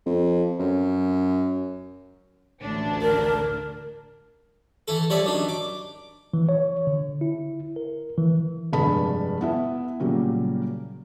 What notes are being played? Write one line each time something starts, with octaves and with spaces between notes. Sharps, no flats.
F2
F#2
A1 D2 D4
A#4
E3 E4 A4
F3 G3 C#5 D5 E5
F#2 D4 D#4
D6
E3
C#5
D3
E4
A#4
E3
F1 G2 G#3 A5 B5
B3 E4 E5
A#2 C#3 F#3 G3